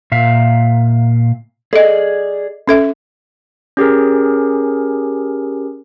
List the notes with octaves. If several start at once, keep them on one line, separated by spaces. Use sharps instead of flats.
A#2 E5 F5
G#4 A4 D5 D#5
C#4 A4 E5
C#4 G4 G#4 A#4